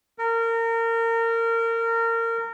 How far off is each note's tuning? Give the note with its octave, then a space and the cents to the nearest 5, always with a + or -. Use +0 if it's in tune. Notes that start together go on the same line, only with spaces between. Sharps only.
A#4 -25